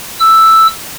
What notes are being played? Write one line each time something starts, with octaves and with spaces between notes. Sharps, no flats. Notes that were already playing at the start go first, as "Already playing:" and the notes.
E6